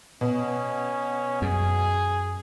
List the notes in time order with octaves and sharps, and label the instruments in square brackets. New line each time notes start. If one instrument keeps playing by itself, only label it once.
[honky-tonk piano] B2 [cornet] C#4
[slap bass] F#2 [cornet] G#4